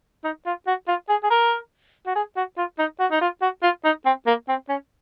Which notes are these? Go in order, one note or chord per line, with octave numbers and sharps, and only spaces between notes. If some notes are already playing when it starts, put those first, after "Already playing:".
D#4
F4
F#4
F4
G#4
G#4
A#4
F#4
G#4
F#4
F4
D#4
F#4
D#4
F4
F#4
F4
D#4
C4
A#3
C4
C#4